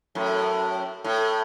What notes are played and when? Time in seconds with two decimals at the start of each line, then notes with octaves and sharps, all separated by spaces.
0.15 F#2 A2
1.04 A2